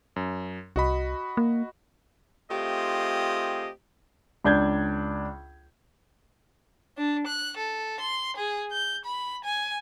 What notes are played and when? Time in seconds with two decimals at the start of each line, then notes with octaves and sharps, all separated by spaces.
0.16 F#2
0.76 C2 F#4 D#5 B5
1.37 A#3
2.51 A3 C4 F4 G4 G#4 D#5
4.44 C#2 D4 G6 G#6
6.97 D4
7.27 F#6
7.57 A4
8.00 C6
8.37 G#4
8.72 G6
9.05 B5
9.44 G#5